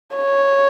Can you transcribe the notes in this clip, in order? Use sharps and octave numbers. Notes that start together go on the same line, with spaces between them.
C#5